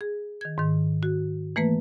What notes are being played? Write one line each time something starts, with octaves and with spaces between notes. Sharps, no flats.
G#4
D#3 G#6
G#2 D#3
F#4
E3 A3 A#3 B4